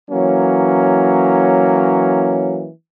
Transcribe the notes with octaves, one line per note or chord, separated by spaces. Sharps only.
E3 F#3 A#3 C#4